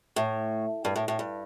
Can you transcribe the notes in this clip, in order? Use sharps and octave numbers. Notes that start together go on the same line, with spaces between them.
A2
G2
A2
A2
G2